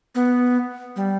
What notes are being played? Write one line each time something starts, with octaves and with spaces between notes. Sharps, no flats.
B3
G3